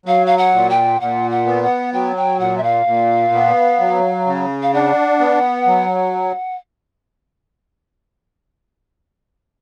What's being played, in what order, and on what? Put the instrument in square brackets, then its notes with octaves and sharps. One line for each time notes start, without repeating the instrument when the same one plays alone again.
[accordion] F#3 [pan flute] F5
[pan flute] F5
F#5
[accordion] A#2
[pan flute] G5
[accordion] A#2 [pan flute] F#5
[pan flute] F#5
[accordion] B3
[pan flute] F#5
[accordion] F#3 [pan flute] G5
[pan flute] G5
[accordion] A#2 [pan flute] F#5
[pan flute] E5
F5
[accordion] A#2
B3
F#3
C#3
[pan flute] F5
[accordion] D4 [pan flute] F#5
[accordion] B3
F#3